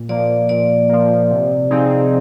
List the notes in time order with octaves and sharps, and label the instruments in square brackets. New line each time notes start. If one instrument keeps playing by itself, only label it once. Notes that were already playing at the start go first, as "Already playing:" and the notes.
Already playing: [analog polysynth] A#2
[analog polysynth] F3 A#3 [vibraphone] D5
[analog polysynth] A#2 [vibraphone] D5
[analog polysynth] F3 A#3
C3
F3 C4 D#4 G#4